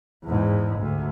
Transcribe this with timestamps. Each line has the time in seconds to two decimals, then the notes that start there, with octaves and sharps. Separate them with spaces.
0.24 E2 G#2
0.79 D2